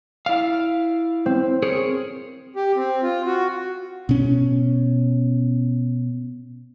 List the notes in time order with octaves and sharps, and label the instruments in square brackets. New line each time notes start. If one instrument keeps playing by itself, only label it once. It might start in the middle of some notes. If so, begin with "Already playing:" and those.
[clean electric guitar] E4 D5 F5
[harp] C4
[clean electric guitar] G#4 A#4 C#5
[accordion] G4
C4
F4
F#4
[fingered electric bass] B2 C#4